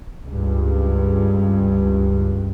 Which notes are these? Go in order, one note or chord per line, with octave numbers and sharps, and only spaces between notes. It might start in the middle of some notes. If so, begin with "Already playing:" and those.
C#2 G2